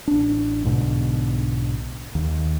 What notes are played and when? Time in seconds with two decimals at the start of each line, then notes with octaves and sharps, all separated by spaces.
0.08 A1 D4
0.64 B1 G#2 B2 D3
2.15 D#2